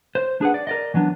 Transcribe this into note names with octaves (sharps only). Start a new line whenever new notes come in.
C5
D4 G#4 B4 F#5
D5
A#4 D5 D#5
E3 F#3 B3 D4